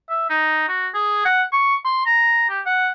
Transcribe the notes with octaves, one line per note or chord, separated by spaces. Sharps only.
E5
D#4
F#4
G#4
F#5
C#6
C6
A#5
G4
F#5